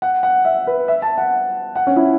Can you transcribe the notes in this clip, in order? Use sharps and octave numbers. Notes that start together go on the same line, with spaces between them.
F#5
F#5
E5
B4
E5
A5
F#5
F#5
C#4
E4